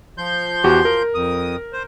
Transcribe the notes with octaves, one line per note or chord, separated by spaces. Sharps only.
F3 C6 G6
E2 F#4 G4
A#4
F2 D#6
C5